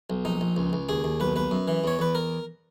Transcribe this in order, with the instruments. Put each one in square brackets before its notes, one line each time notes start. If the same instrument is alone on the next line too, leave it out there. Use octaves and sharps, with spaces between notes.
[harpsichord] B1
A#1 D#4
A#1
C#2
C#2
D#2 G#4
D#2
B1 B4
B1 B4
F#2
E3
E2 C#5
E2 B4
A#4